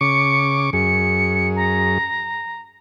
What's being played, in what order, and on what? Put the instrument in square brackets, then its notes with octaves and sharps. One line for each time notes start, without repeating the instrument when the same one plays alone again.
[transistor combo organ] C#3 C#6 D6 [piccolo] C#7
[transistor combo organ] F#2 G#4 [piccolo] C#7
[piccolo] A#5